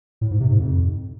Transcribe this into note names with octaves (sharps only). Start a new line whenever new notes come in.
A2
G#2
C3
G#2
F2